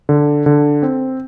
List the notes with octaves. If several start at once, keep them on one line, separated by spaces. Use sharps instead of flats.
D3
D3
C4